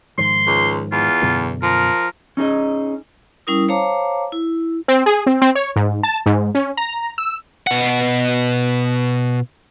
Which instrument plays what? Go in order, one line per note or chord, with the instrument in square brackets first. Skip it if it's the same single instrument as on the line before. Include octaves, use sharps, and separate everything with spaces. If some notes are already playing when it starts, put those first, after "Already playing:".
[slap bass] G#2 D#3 F3 [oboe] C6
[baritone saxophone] C#2
[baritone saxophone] E2 [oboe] F4
[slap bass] F#2 B2 D3
[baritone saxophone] F3 [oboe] A#4
[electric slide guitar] C#4 D#4 G#4 D#5
[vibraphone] G3 C#4 E4 A#4 D#6
C5 C#5 F5 A5 A#5 D6
E4
[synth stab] C4
G#4
C4
C4
C#5
G#2
A5
G#2
C#4
A#5
E6
[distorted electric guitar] B2 F#5